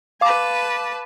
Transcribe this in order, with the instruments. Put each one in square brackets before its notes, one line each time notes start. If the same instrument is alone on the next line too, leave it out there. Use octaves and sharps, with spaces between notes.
[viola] B4 A5 [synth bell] F5 D6